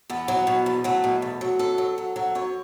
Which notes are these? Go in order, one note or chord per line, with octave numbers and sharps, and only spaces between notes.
E2 B3
F#3
B2
E2
F#3 A3
B2
E2
F#3
F#2 A4
F#3
F#3
F#3
F#2 C#5